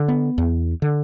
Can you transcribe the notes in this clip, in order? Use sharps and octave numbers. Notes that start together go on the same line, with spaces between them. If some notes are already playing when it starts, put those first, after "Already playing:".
Already playing: D3
B3
E2
D3